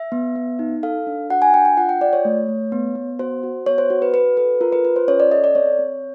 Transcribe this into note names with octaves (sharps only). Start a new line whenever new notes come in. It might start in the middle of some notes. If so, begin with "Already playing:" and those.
Already playing: E5
B3
B3
D#4
A4 F5
D4
F#4 F#5
G#5
D4 G5
G5
F4 F#5
G5
F4 D5
C#5
A3
A3
B3
B3
F#4 C5
F#4
B3 C#5
C5
F#4
B4
F#4 B4
A4 B4
F4 A#4
B4
F4 B4
C5
C#4 C#5
D5
A4 D#5
D5
C4 C#5
C4